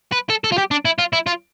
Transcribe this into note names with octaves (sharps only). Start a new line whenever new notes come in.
B4
A4
A4
F4
G4
D4
E4
F4
E4
F4